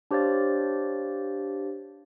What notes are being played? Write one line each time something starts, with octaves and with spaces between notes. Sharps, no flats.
D4 G4 C5 C#5 F5 A6